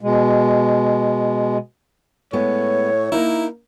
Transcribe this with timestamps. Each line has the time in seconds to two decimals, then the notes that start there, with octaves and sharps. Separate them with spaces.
0.01 B2 G#3
2.33 A2 G#3 B3 C#5
3.12 A#3 D#4 E4 A#4